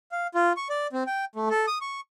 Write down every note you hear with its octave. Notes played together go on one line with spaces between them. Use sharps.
F5
F4
C#6
D5
C4
G5
A3
A4
D#6
C#6